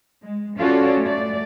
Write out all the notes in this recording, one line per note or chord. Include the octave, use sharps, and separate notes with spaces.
G#3
C#4 F4 F#4 A4 C#5 D5
A3 D5